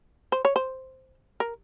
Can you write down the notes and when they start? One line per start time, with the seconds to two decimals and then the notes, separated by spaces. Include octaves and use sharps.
0.32 C5
0.45 C#5
0.56 C5
1.40 A#4